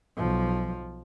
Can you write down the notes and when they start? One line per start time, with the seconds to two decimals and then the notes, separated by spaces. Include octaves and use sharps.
0.17 B1 F3